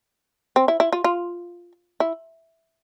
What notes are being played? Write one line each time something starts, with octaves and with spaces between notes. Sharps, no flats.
C4
E4
E4
F4
F4
E4